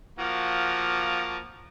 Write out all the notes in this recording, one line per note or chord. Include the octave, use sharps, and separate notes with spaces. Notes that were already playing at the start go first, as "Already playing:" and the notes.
F3 A#3 F#4